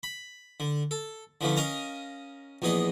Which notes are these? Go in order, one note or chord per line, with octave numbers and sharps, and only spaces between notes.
B5
D3
A4
D3 E3 F3 A3 C#4
C#4 A#4 D#5 F5 G#5 A#5
A#1 E2 B3 G#4 D#5